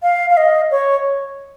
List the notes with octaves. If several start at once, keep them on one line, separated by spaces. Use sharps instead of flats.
F5
F5
D#5
C#5